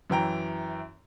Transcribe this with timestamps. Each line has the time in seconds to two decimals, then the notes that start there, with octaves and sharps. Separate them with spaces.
0.10 F#2 E3 G5 A#5